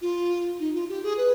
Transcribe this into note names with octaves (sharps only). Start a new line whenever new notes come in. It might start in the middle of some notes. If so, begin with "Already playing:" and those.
F4
D#4
F4
G4
G#4
B4